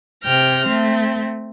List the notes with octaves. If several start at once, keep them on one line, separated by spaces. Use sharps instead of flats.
C3 G5 F6 A#6
A3 C4